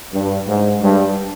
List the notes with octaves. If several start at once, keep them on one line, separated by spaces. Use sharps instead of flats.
G2
G#2
G2